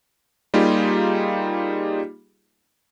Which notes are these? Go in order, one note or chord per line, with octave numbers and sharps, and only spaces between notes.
G3 A#3 D#4 F4 G4 G#4